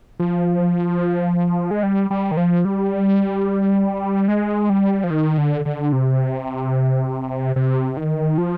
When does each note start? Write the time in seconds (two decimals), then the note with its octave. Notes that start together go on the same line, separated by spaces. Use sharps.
0.20 F3
1.71 G#3
1.83 G3
2.11 G3
2.31 D#3
2.37 F3
2.65 G3
4.28 G#3
4.70 G3
5.04 F3
5.10 D#3
5.38 D3
5.65 D3
5.92 C3
7.56 C3
7.97 D#3
8.38 F3